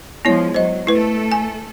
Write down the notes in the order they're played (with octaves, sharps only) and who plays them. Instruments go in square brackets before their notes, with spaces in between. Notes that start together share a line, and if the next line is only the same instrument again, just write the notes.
[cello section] F3 G#3 [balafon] B3 E4 C#5
[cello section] F#3 [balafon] C5 D#5
[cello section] A3 A4 [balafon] E4 B4
[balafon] G#5